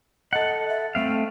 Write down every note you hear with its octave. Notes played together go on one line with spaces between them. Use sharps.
A4 D#5 F#5
E5
A3 C4 E5 F5